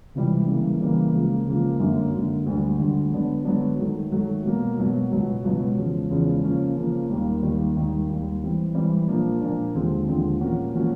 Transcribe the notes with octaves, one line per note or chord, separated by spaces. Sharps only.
C#2 C3 E3 G3
C#3 E3 G3 A#3
C#3 E3 G3 A#3
C#2 C#3 F3 A#3
C#2 C#3 F3 A#3
F#2 D3 F#3 A#3
F#2 D3 F#3 A#3
D2 D3 G3
D2 D3 G3
D3 F#3 B3 D4
D3 F#3 B3 D4
D#3 F#3 A3
D#3 F#3 A3
B2 F#3 A#3
B2 F#3 A#3
C#2 B2 F#3 B3
C#2 B2 F#3 B3
E2 C#3 F3 G#3 C#4
E2 C#3 F3 G#3 C#4
C#3 F3 A#3 C#4
C#3 F3 A#3 C#4
D#2 D#3 G3 A#3
D#2 D#3 G3 A#3
D#2 D#3 G3
D#2 D#3 G3
E3 G3 C4
E3 G3 C4
A#2 F3 A#3 D4
A#2 F3 A#3 D4
D#2 D3 F3 G#3 C4
D#2 D3 F3 G#3 C4
A#2 F3 A#3 C#4 F#4
A#2 F3 A#3 C#4 F#4